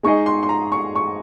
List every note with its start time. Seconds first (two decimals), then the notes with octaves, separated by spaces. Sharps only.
0.03 G#3 D#4 G#4 D#5 C#6
0.26 C6
0.43 C6
0.49 A#5
0.72 C#6
0.96 C#6